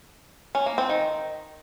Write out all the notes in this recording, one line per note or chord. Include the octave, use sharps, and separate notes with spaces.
C#4
A#3
C4
D#3